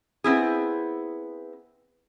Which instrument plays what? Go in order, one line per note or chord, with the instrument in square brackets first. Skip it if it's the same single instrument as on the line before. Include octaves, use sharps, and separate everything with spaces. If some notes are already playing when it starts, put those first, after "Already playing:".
[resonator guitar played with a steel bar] B3 C4 E4 G#4